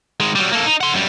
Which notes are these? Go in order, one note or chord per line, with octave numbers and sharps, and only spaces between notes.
D#3 G#3
F#3 G3
A#3 A4
D#4
F#5 C6
F#2 G3